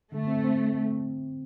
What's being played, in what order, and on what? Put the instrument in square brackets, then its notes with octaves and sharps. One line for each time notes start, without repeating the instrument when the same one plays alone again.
[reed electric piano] D3 [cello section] A3
[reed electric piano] C4
C4